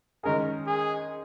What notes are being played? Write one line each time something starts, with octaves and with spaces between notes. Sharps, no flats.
D#3 G#3 C#4 G#4 A#4
G#4